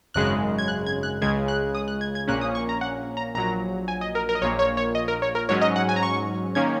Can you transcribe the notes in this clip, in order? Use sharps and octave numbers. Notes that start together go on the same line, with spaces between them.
G#1 F#2 C#3 G#3 F#6
G#6
F#6
G#6
F#6
C#2 C#3 G#3 G#6
F#6
D#6
F#6
G#6
G#6
A#1 A#2 A#3 C#4 F#6
D#6
C#6
A#5
F#5
A#5
A#1 A#2 F#3 A#5
G#5
D#5
A#4
A#4
D#5
A#1 A#2 A#3 C#5
C#5
C#5
D#5
A#4
C#5
A#4
G#2 F#3 C#4 C#5
D#5
F#5
G#5
A#5
C#6
D#3 A#3 C#4 G#6